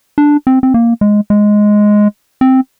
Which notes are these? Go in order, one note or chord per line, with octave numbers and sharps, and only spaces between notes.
D4
C4
C4
A#3
G#3
G#3
C4